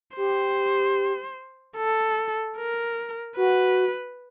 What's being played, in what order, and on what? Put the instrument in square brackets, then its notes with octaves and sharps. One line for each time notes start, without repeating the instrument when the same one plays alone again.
[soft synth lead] G4 [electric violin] C5
[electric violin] A4
A#4
[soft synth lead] F#4 [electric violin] B4